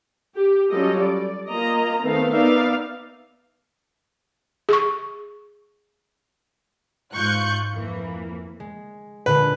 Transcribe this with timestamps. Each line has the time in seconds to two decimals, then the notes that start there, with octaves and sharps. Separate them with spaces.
0.37 G4
0.71 F#3 G3 C#4 F4 A4 D#5
1.00 D5
1.50 A#3 F4 D#5 A#5
2.03 D#3 A3 B3 C4 A4 F5
2.34 B3 D#4 D5 E5 F5
4.69 G#4 C#6
7.15 G#2 F4 C#6 F#6 G6 C#7
7.74 F2 E3 A#3
8.60 G#3
9.26 A#2 D3 G#3 B4